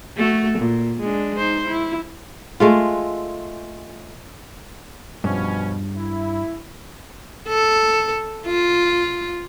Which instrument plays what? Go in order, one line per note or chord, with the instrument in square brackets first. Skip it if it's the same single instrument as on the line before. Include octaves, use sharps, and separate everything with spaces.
[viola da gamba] A3 F#4 A4
A#2
G#3 D4
D#4 C5
E4
[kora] G#3 A3 F4
[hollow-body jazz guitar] G2 [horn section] B2 F3 C#4
[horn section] E4
[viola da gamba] A4
F4